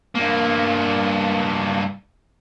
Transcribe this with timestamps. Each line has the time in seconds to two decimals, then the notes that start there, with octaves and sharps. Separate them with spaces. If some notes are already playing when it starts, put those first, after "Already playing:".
0.15 G2 A#3